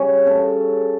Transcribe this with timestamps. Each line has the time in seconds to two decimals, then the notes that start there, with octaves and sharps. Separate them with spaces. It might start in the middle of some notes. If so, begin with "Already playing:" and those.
Already playing: C#3 G3 C#4
0.27 C#3 A4